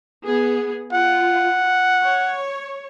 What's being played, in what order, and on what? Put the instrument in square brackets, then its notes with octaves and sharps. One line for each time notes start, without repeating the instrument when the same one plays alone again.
[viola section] B3 G#4
[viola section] F4 [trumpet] F#5
[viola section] C#5